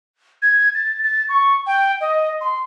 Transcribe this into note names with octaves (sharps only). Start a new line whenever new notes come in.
G#6
A6
A6
C#6
G5
D#5
C6